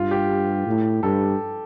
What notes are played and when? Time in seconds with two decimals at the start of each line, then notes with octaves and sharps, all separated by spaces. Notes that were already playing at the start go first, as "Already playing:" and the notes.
Already playing: G2 F4
0.11 G4
0.67 A2
1.03 G2 A4